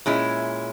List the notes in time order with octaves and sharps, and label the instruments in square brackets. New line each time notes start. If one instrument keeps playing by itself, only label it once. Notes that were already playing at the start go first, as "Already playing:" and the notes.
[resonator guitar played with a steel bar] A#2 G#3 C#4 E4